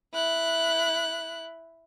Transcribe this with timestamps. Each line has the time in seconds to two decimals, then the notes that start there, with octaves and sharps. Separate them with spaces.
0.14 E4 F#6